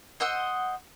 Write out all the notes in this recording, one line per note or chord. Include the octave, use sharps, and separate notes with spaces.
C5 D#5 F#5 E6